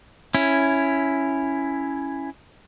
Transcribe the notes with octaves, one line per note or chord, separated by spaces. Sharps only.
C#4 E4